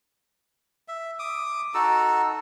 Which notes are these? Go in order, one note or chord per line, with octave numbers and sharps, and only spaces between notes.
E5
D6 D#6
D#4 F#4 A4 E6